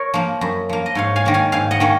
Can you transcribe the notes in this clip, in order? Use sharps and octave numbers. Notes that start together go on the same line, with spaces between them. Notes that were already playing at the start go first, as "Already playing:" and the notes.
Already playing: A#4 C#5
F3 A#3
F#2
F3 A#3
D#5
G#2 C#5 F5
F5 G#5
D#3 A#3 C#4
F5 G#5
G#2 F5 G#5
D#5 F#5
D#3 A#3 C#4